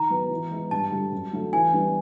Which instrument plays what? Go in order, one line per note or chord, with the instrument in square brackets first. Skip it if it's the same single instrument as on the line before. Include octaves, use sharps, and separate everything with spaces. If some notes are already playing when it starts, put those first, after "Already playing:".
Already playing: [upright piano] D#3 [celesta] A#5
[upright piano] F#3 B3
E3
G#3 B3 E4
[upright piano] G2 [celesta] A5
[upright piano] D3 G3
F#2
D3 F#3 A3
[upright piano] E3 [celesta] G#5
[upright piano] G3 B3 D4